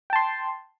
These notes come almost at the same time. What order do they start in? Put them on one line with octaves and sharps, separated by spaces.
G5 A5 C6